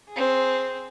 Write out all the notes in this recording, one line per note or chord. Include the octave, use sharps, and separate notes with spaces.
C4 G#4